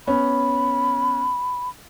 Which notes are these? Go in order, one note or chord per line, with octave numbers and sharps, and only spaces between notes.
B3 C#4 B5